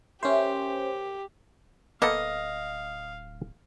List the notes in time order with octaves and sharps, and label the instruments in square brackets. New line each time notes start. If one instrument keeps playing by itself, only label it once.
[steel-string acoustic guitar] D2 A#4 E5 [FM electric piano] C#4 C5 [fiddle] G4
[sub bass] D1 [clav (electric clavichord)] A#3 B3 A4 [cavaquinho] D#5 [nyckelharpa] F5